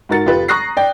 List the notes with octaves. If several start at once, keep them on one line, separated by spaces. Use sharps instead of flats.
G#2 F#4 A#4 A6 C#7
F1 F4 G4 B4
A#5 C#6 D#6 F#6 A#6 C7
D5 G5